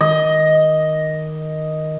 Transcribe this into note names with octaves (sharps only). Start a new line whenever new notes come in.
D#3 D#5